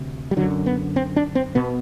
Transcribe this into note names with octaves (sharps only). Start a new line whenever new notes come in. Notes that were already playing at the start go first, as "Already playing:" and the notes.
Already playing: D2 C3
G3
F#2 D3 F#3
B3
C4
D4
C4
B2 B3